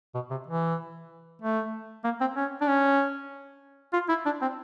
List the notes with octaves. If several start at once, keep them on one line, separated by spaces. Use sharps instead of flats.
B2
C3
E3
A3
A#3
C4
C#4
D4
C#4
F4
E4
D4
C4